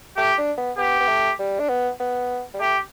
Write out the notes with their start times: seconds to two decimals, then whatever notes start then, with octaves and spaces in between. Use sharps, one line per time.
0.17 A3 G4
0.38 D4
0.58 B3
0.78 B3 G4
1.00 B3
1.09 A3
1.39 G3
1.60 D4
1.69 B3
2.00 B3
2.54 G3
2.60 A3 G4